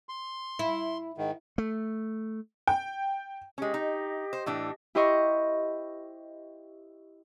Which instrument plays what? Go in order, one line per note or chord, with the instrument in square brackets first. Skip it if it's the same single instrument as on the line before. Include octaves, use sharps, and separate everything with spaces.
[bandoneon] C6
[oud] E4
[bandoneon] G#2 D#3
[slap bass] A3
[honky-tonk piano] G5
[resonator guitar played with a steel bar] G#3 C#4 [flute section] G4 D#5
[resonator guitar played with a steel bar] D#4
C5
A2 E3 D4
[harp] E4 G4 C5 D#5 C#6